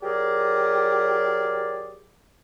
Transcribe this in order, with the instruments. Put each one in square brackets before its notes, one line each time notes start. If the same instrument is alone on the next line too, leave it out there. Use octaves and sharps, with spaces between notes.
[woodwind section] F#3 G4 G#4 A#4 D5